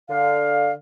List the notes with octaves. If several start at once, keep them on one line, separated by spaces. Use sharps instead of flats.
D3 F5